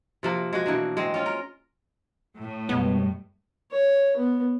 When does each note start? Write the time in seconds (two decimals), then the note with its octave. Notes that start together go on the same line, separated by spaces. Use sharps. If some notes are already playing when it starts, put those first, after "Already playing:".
0.23 C3 F3 A#3
0.53 G#3 F#4
0.66 B2 E3 A#3 D4
0.97 G#3 C4
1.14 C#4 F4
1.26 A#4
2.37 A2
2.69 F#2 B2 G3 G#3 B3
3.71 C#5
4.17 B3